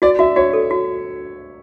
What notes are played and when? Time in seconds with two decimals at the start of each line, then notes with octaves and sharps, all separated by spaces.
0.02 F#4 D5
0.19 F#4 E5
0.36 F#4 C#5
0.53 A4
0.71 F#4